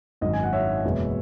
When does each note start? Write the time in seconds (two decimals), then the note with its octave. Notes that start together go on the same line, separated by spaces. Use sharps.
0.21 G#1 F#2 D#3 D#5
0.33 G#5
0.43 F#5
0.53 C#5 E5
0.84 F#1 E2 B2 G#3 B3